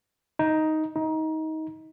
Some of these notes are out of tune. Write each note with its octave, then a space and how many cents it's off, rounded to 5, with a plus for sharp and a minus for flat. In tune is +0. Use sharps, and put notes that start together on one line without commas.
D#4 +10
D#4 +25